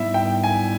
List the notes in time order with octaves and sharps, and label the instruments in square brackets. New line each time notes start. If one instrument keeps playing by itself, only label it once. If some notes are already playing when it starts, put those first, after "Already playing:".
Already playing: [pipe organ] G#2 G3 B3 E4 [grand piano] E5
[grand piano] G5
G#5